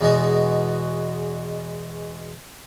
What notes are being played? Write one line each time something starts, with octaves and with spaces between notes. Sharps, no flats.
E2 B2 G#3 F#4